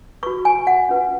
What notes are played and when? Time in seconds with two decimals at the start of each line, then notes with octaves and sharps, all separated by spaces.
0.23 B4 C#6
0.26 F#4
0.45 G#5
0.67 F#5
0.89 C#4 F4 B4